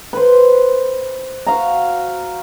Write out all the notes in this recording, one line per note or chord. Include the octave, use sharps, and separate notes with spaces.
B4 C5
F#4 F5 A#5